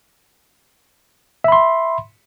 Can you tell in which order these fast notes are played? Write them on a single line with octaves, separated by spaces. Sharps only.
E5 B5 C6